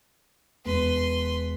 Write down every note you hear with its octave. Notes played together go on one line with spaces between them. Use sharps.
E1 B4 C6